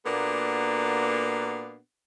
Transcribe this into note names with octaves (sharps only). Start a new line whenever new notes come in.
A#2 A#3 B3 D4 F#4 A4